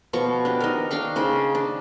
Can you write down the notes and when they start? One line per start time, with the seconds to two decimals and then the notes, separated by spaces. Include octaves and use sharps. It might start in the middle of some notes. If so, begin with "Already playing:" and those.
0.13 B2 F3 C#6
0.45 D4 G4
0.60 D#4 A#4
0.91 D4 F5 G5 C#6
1.16 C#3 D#4 C5
1.55 D4